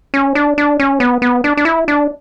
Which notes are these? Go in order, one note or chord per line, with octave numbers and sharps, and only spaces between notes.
C#4
D4
D4
C#4
B3
B3
D4
D4
E4
D4